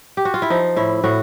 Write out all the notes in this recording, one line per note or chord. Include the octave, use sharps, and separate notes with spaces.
G4
F#4
F4
E4
F3 D#4
A2 E4
A2 F#4